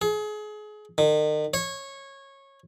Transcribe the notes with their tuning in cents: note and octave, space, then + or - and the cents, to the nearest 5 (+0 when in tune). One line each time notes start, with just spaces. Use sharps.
G#4 +30
D#3 -40
C#5 -20